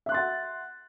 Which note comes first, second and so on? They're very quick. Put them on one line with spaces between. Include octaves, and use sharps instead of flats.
E5 F#6 C6 A6 F#5